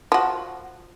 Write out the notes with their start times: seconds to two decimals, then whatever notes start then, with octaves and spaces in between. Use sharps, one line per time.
0.12 F3 F#4